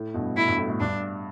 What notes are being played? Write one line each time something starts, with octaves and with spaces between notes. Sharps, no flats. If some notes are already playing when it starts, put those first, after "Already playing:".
Already playing: A2
G2 B2
A2 E4
G2
A2
A2
G2 D4